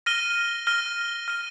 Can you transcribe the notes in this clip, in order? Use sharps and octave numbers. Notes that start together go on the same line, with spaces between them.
F6 A#6 D#7 G7
F6 A#6 D#7 G7
F6 A#6 D#7 G7